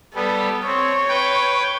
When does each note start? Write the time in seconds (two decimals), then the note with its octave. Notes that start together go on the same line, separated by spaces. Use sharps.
0.15 G3 B3 A4
0.67 C4 C#5
1.09 B4 G5